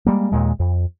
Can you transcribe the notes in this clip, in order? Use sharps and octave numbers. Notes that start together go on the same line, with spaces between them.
G3 G#3 A#3
D#2 A#2 G#3
F2